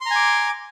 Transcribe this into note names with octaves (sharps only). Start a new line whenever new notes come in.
G#5 A#5 C6 D6